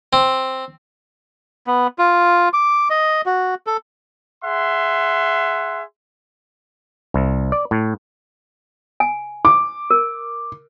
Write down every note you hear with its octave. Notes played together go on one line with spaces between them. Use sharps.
C4
B3
F4
D6
D#5
F#4
A4
G#4 E5 F#5 C6
C2
D5
A2
G#5
D6
A#4